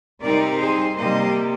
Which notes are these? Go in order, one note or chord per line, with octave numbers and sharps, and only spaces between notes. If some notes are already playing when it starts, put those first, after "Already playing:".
C3 G3 C4 D#4 A#4 D5
G#4 C5
C3 G3 A#3 C5 D#5